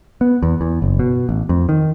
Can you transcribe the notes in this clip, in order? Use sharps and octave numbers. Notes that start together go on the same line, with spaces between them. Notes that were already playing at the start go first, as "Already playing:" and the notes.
B3
E2
E2
F#1
B2
A1
F2
D#3